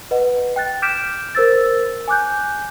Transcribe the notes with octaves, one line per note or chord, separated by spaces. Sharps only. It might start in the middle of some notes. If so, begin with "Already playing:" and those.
B4 D#5 F#5
G5 F#6 A6
D6 F6 G6 B6 D7 E7
A#4 C5 E6 A6
G#5 D6 F#6 G6